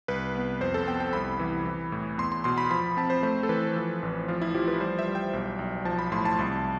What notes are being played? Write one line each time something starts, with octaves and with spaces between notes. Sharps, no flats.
C2 B4
B3
F2 C5
A4
B3 G5
G5
C2 B5
E3
E3
A2
E2 C6
C6
B2 C6
B5
F3 B5
C4 A5
C5
A3 C5
A4
E3 B4
F3
A1
F3 F4
E4
F3 G4
B4
G3 C5
E5
G3
G5
B1
B1
F3 A5
B5
A2 C6
A5
C2